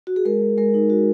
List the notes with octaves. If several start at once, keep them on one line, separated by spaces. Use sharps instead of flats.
F#4
G#4
G#3 A#4
G#3
G#3 A#4
D#4
F#4